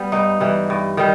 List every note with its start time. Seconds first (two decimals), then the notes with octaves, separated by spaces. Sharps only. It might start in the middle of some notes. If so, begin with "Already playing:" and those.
Already playing: G3 B3
0.12 G2 D#4
0.40 E3 G3
0.70 G2
0.97 D#3 G3